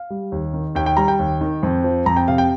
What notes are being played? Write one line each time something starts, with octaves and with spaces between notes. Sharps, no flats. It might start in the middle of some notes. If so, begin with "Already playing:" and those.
Already playing: F5
G3
D#2
D#3
D#2 G5
G5
G3 A#5
G5
D#2
D#3
F2
F3
F2 A#5
G5
C3 F5
G5